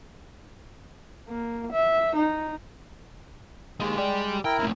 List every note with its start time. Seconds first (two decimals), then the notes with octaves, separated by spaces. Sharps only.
1.28 A#3
1.72 E5
2.16 D#4
3.80 G#3 D#4 G4
3.98 G4 D5
4.45 E4 A#4 G5
4.59 D#2 A2